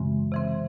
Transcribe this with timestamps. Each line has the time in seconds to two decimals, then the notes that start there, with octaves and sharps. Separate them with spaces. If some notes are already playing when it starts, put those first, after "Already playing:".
Already playing: F#2 C#3 E3 G#3 C4
0.32 C3 E3 C4